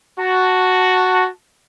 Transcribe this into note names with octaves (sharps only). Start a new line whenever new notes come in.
F#4 A5